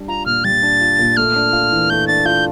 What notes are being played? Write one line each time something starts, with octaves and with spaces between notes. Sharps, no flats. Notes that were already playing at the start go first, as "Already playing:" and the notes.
Already playing: G3 D4
F4 A#5
A#2 F6
G3 A6
D4
F4
A#2
A3 F6
D4
F4
E3
A3 G6
D4 A6
F4 G6